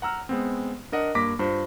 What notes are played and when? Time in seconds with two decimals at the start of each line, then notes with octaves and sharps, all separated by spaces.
0.02 F#5 A#5 E6 F6
0.29 G#3 B3 C4
0.92 D4 A#4 D#5 F#5
1.15 G2 A#3 D6 A#6 B6
1.39 G2 F4 C5